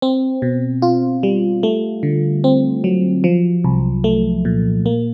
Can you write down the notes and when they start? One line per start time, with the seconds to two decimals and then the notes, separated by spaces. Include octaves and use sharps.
0.02 C4
0.42 B2
0.82 F4
1.23 G3
1.63 A3
2.03 D3
2.44 C4
2.84 F#3
3.24 F3
3.64 C2
4.04 A3
4.45 A#2
4.86 A#3